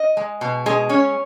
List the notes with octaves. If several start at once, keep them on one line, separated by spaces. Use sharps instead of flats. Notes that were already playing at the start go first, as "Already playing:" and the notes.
Already playing: D#5
G#3
B2
G#3 G#4
C#4 C#5